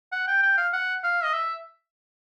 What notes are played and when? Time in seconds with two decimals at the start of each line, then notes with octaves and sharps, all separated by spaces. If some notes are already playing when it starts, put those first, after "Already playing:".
0.12 F#5
0.28 G5
0.43 G5
0.58 F5
0.73 F#5
1.04 F5
1.24 D#5
1.34 E5